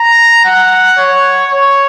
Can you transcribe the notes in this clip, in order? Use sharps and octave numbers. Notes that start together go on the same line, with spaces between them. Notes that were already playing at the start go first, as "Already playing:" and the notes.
Already playing: A#5
F#5
C#5
C#5